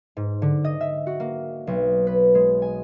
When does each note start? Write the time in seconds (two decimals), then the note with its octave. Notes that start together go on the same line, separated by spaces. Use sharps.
0.17 G#2
0.42 D3
0.65 D#5
0.81 E5
1.07 F#4
1.20 A#3
1.67 B1
2.07 B4
2.35 G#3
2.62 G#5